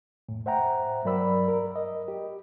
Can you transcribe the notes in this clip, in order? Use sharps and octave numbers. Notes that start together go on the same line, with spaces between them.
F2 A2
C5 E5 F#5 G5 A#5
G2 F#3 A#4 D5 B5 E6
A#4
D#5
G4